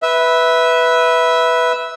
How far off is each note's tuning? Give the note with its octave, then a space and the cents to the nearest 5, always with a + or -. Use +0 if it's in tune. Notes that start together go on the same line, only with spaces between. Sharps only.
B4 +0 E5 -10